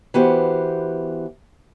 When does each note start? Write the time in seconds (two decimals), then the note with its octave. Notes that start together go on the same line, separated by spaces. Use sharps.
0.14 E3 B3 F#4 G4 C5